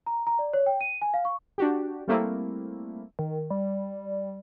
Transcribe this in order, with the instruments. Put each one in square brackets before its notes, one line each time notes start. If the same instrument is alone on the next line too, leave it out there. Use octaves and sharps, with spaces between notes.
[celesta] A#5
A#5
D5
C#5
G5
D#7
G#5
F5
C#6
[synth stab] D4 F#4 G4
G3 A3 A#3 C4 E4
[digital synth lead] D#3
G3